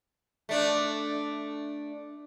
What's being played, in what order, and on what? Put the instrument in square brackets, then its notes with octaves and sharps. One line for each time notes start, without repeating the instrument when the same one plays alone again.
[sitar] A3 D4